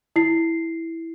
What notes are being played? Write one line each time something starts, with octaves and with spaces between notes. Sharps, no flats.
E4 C7